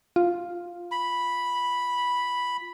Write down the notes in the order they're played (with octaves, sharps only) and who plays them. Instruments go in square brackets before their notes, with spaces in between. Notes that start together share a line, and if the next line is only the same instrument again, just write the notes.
[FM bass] F4
[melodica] B5